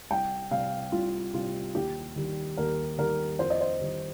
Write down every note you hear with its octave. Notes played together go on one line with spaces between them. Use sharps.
C2 G5
C3 G3 F5
C2 F4
C3 G3 F4
D#2 G4
D#3 G3
D#2 A#4
D#3 G3 A#4
F2 C5
D#5
C5
D#3 G3